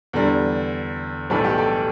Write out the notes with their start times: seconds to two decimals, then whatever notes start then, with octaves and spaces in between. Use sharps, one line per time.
0.13 E2 D3 G3
1.30 B1 A2 E3 G3 A4
1.44 G4
1.58 A4